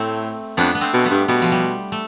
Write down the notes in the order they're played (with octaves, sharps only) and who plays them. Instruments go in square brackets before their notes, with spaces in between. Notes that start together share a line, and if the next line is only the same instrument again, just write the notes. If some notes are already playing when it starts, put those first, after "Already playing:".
Already playing: [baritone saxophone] A2 [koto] A3 C4
[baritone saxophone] F2 [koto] B3 D4
[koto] B3
A3 C4
[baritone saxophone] B2
[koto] G3 B3
[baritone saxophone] G2
[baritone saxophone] B2 [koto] G3
[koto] F3
G3
A3